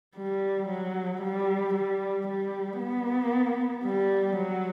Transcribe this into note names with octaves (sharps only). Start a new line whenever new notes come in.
G3
F#3
G3
G3
G3
B3
G3
F#3